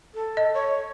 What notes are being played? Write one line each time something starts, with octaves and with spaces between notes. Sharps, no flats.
A4
D#5
C#5